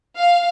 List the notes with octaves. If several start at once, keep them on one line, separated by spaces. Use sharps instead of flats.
F5